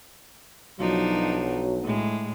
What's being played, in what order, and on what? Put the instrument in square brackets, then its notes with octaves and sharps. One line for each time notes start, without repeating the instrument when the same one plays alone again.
[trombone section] B1 F#3 [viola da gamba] F3 D4 D#4
[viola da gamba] A2 G#3